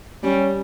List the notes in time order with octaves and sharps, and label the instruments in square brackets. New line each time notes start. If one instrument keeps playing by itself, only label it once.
[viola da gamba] G3 [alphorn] C#4